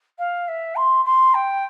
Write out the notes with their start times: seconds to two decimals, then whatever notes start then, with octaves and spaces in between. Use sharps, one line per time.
0.18 F5
0.48 E5
0.76 C6
1.05 C6
1.34 G5